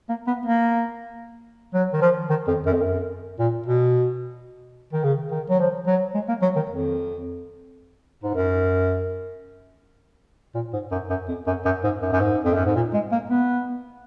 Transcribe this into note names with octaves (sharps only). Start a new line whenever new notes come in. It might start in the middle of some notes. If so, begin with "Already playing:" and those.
A#3
B3
A#3
F#3
D#3
F3
D#3
F2
F#2
F2
F#2
A#2
B2
D#3
C#3
D#3
F#3
F3
F#3
G#3
A#3
F#3
D#3
F2
G#2
F#2
A#2
G#2
F#2
F#2
F2
F#2
F#2
G#2
F#2
F#2
G#2
F2
F#2
G#2
A#2
G#3
A#3
B3